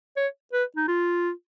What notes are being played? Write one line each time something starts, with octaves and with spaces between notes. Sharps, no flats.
C#5
B4
D#4
F4